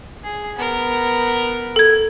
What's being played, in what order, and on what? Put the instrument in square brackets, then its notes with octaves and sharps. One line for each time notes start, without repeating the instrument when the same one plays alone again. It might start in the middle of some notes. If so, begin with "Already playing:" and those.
[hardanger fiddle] G#4
B3 A#4
[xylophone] A4 G#6